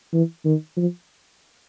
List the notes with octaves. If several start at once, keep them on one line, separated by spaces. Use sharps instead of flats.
E3
D#3
F3